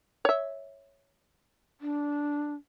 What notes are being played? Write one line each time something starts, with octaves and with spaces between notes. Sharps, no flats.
C#5 E5
D4